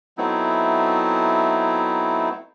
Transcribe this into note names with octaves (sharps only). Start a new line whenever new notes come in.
F#3 A3 B3 C4 D#4 E4